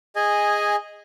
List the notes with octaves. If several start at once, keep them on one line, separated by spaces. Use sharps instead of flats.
G#4 D#5 G#5